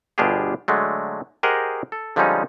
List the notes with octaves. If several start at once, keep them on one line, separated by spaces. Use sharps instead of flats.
G1 B2 D4 F4 G4 G#4
D3 F#3 G#3 A3
G4 G#4 A#4 C5 D#5 F#5
A4
D3 F3 G3 G#3 C#4 D#4